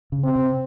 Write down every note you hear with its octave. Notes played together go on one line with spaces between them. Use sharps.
C#3
C4
C3